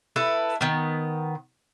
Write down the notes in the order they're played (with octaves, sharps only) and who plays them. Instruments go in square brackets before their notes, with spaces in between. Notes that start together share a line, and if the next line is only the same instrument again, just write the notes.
[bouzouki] E4 A4 B4
D#3 B3